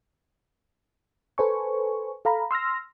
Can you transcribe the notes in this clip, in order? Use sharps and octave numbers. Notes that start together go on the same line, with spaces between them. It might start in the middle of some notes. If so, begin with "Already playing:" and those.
A4 B4 C5 G#5 C#6
A4 F5 A#5 B5
C6 E6 F6 A#6